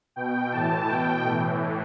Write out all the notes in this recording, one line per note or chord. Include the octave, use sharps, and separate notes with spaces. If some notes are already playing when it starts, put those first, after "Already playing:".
B2 G5
A2 E3 A5
B2 G5
A2 E3